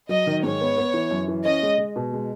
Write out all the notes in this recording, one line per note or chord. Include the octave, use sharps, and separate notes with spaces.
F#3 D#5
D#3
G#2 C#5
B3
B3
E3
F#2
E3
C#4 D#5
G#3
G#3
B2
G#3